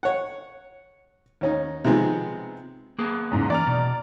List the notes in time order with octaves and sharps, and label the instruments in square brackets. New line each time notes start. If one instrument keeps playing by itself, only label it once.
[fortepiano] C#5 F#5
D#2 C#4 D#4
C3 D#3 F3 G#3 B3
[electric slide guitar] A#3 B3 G#4
[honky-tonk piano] E2 G#2 C#3
[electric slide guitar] E3 [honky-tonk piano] D5 A#5 F6
[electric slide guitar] B2